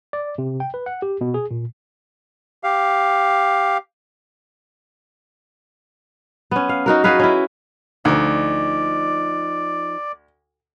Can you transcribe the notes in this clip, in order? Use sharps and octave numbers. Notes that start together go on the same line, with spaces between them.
D5
C3
G5
B4
F#5
G4
B2
G#4
A#2
G4 F5
B3 C#4
F5
D#4 F#4 A#4
F#4 G#4 B4 F5
C#4 E4
D2 F3 D#4 D5